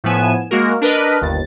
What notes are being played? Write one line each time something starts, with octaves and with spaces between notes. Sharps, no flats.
A2 F3 B3 G#5 E7
G#3 A#3 F#4 A#4
D4 A#4 B4 D#5
G1 D#2 A6